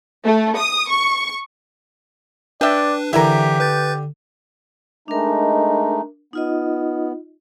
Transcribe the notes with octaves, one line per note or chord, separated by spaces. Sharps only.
A3
D#6
C#6
D4 B4 D5 E5 G5
D3 E3 E4 G4 A#4 E5
B4 G6 A6
G#3 A3 D4 D#4 A#4
B3 D#4 F4 D#5